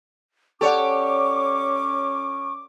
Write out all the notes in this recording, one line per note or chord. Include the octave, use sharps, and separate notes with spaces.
C#4 G4 A4 C#5 D5 F#5 C#6 D6